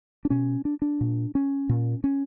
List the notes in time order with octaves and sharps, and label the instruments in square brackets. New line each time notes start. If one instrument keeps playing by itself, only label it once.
[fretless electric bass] D4
B2 C#4
D4
D4
A#2
C#4
A#2
C#4